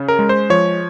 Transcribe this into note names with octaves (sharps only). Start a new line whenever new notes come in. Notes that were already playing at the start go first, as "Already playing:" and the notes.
Already playing: C#3 C#4
A#4
G#3
C5
F3 C#5